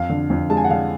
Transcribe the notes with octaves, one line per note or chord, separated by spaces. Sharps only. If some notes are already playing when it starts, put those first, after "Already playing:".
Already playing: F2 F5
D3
F2
G#3 A5
G#5
F#5
D3 F5